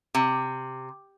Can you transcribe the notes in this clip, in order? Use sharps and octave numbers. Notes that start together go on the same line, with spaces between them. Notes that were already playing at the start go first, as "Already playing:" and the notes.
C3